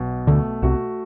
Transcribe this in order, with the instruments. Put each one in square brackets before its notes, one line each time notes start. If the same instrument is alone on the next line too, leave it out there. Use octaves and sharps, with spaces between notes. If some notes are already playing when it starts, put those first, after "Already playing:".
Already playing: [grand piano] B1 B2
[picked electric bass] D2 D3 [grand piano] A3
[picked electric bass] C2 C3 [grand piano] F#4